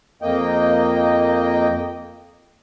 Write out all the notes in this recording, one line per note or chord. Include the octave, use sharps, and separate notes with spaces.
F2 A#3 D#5 G5